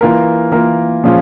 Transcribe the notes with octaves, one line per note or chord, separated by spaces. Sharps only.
E3 A#3 F4 A#4
E3 A#3 F4 A#4
A#2 F3 G#3 C#4 F4